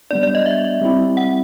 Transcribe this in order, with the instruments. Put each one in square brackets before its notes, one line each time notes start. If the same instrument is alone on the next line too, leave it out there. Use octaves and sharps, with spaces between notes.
[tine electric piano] G3 B3 D4 [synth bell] D5
[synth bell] D5
D#5
E5
[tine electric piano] G3 C4 E4
[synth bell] F#5